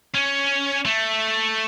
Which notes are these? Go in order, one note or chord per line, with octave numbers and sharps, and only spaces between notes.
C#4
A3